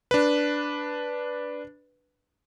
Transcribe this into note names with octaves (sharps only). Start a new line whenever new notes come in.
D4 B4